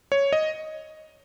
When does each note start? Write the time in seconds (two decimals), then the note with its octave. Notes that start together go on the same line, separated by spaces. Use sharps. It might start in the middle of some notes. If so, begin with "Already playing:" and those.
0.12 C#5
0.33 D#5